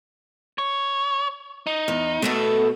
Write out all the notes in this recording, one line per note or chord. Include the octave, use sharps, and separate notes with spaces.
C#5
D#4
E2
B2 A3 B3 A4